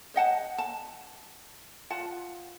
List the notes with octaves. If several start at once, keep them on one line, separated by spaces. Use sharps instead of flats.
C5 D#5 F#5 A5
A5
F4 F#5 A5